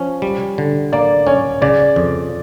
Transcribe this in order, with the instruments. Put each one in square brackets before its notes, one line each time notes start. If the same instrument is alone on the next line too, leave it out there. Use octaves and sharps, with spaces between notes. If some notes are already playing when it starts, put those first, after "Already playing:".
Already playing: [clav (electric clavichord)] F3 C#4
G3
D3
[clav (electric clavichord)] A#3 [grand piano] D5
[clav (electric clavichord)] C#4 [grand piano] C#5
[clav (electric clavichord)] C#3 [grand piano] D5
[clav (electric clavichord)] F2